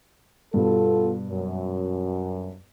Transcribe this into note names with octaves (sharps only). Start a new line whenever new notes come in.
G2 B2 B3 F4 A4
F#2